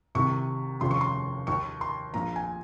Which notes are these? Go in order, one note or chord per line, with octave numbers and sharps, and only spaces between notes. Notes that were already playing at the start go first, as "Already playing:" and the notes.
C2 C3 D#3 C#6
F1 D#2 C#3 F3 C6
C#6
C6
D#2 D#3 C#6
C6
A#1 A#2 F3 A#5
G#5